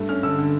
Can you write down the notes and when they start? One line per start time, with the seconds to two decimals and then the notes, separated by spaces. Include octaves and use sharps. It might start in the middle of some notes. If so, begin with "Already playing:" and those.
Already playing: G2 A3
0.09 C#4 F6
0.23 D3 E6
0.38 D3